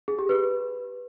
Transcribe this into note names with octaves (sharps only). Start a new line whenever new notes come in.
G#4
G4
B4